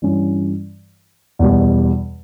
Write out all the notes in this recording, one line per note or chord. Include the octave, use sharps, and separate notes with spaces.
G2 E3 G3 C#4 E4
E2 B2 G3